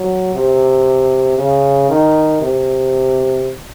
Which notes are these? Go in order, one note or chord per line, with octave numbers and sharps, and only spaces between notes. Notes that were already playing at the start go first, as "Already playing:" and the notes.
Already playing: F#3
C3
C#3
D#3
C3